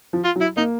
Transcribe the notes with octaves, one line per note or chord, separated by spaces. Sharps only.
F3
F4
F#3
E4
A#3 D#4